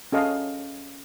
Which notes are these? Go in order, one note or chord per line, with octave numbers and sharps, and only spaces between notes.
C#4 A4 D#5 F5